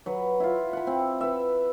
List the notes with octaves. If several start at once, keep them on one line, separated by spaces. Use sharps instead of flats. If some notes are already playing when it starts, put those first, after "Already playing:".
F#3 B4
E4 F4
F#5 B5
C4
B4 E5